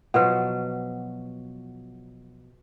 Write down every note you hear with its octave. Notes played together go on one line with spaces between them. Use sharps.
B2 F3 F#3 B4 F#5